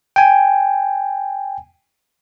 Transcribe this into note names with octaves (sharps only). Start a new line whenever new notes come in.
G5 G#5